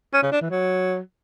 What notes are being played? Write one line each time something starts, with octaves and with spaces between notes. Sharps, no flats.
C#4
C#3
D4
E3
F#3